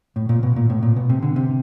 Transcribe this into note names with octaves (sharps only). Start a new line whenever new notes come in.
A2
A#2
B2
A#2
A2
A#2
B2
C3
D3
C3